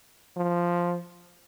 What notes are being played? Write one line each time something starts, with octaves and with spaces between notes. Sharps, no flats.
F3